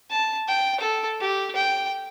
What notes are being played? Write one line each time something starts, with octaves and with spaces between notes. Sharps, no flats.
A5
G5
A4
G4
G5